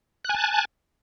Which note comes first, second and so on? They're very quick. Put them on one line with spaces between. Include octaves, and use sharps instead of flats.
F#6 G#5 A5